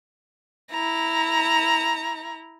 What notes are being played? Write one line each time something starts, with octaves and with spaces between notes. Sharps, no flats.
E4 A#5